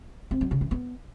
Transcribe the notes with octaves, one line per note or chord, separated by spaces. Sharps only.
C4
F#3
C#3
E3
B3